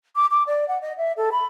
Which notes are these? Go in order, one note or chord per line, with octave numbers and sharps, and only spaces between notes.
D6
D6
D5
F#5
D#5
E5
A4
B5